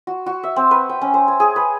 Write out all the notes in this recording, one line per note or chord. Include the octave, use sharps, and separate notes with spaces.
F#4
F#4
E5
C4
B4
G5
C#4
C5
G#5
G#4
B4